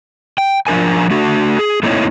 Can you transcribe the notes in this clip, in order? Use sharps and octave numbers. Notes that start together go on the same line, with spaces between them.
G5
F3 D4 A#4 G#5
A3 D4 F#4
G#4
A3 A#3 C4 D#4 E4 C#5